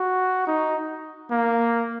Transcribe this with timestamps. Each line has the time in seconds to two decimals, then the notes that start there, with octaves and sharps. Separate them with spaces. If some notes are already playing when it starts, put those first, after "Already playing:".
Already playing: F#4
0.47 D#4
1.31 A#3